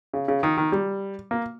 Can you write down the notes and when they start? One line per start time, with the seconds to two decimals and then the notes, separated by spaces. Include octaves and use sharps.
0.14 C#3
0.28 C#3
0.43 D#3
0.58 D#3
0.72 G3
1.31 A#3